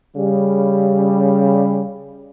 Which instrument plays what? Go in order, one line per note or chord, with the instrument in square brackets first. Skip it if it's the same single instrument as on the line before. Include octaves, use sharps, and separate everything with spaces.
[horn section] C#3 G3